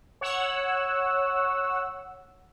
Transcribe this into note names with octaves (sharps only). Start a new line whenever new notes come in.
C#5 F#5 E6